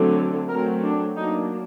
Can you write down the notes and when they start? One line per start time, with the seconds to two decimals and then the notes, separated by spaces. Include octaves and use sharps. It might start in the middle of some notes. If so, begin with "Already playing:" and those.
Already playing: D3 F#3 A3 C4
0.49 F#3 A3 C4 A#4
0.83 D4
1.16 F#3 A#3 D4 D#4